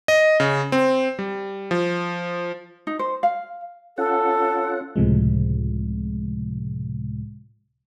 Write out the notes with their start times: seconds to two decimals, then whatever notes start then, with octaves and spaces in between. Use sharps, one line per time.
0.08 D#5
0.40 C#3
0.72 C4
1.19 G3
1.71 F3
2.87 D#4
2.99 C5
3.23 F5
3.98 C#4 F4 A4 F#5
4.96 C#2 A2 C3 F3 G#3